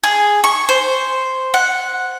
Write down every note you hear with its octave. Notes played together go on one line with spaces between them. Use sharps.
G#4
C#6
C5
F#5